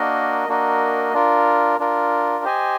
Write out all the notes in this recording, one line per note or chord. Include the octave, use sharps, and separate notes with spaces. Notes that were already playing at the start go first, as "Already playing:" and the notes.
Already playing: A#3 D4 F#4 A#4 D#5
A#3 D4 F#4 A#4 D#5
D4 F4 A#4
D4 F4 A#4
G4 C5 D#5 G#5